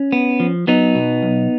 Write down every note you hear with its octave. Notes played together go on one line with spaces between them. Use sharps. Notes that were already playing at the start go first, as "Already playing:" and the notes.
Already playing: C#4
B3
F3
F#3 B3 D#4
B2
B1